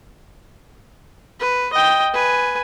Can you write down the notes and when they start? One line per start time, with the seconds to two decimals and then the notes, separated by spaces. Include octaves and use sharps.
1.40 B4
1.73 D#5 G5
2.14 B4 G#5